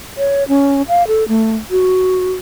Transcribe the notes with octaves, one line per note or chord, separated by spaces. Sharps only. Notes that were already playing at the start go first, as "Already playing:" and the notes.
C#5
C#4
F5
A4
A3
F#4